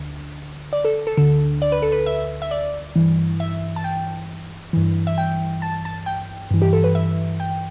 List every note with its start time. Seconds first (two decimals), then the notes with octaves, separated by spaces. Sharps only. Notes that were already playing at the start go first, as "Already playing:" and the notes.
Already playing: D2 D3
0.73 D5
0.85 A4
1.07 A4
1.17 D2 D3 A4
1.62 D5
1.72 B4
1.82 A4
1.92 B4
2.06 E5
2.42 E5
2.51 D5
2.95 G2 E3
3.40 E5
3.76 A5
3.84 G5
4.73 G2 E3
5.07 E5
5.18 G5
5.62 A5
5.85 A5
6.06 G5
6.51 G2 E3
6.62 G4
6.73 A4
6.84 B4
6.95 E5
7.40 G5